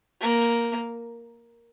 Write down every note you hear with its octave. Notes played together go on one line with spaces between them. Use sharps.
A#3